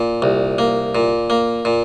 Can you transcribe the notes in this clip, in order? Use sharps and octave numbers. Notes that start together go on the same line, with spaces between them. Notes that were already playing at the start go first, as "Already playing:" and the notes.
Already playing: A#2
C2
A#3
A#2
A#3
A#2